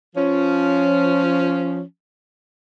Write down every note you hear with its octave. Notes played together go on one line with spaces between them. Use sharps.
F3 C#4